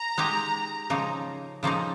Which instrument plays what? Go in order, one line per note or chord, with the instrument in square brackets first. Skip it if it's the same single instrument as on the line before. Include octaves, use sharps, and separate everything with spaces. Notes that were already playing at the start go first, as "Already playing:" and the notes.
Already playing: [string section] A#5
[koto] G#3 D#4 G4
C#3 F3 A#3 D#4
C#3 F3 A#3 D#4